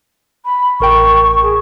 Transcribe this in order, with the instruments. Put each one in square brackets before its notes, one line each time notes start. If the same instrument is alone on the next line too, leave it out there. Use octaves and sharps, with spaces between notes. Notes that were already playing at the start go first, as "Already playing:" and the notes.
[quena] B5
[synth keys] A1 A#4 G5 [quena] C#6
[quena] G#4